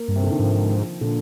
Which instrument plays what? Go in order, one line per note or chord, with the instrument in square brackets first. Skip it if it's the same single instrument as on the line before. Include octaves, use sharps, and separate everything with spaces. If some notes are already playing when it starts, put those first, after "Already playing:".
Already playing: [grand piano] A#3
[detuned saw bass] G2
[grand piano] C3
D3
D#3
[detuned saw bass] G#2 [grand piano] F3
[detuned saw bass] A#2 [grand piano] D3